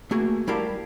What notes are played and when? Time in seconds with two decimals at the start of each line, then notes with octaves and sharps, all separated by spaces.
0.11 A3 A#3 F#4 G#4
0.47 G3 E4 G4 A#4 F5 A5